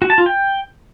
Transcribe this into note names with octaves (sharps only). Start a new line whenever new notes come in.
F#4
A5
F4
G5